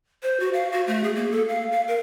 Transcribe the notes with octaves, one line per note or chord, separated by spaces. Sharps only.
C5
F#4
F5
F#4
A3
G#4
A#3
A4
F5
F5
A#4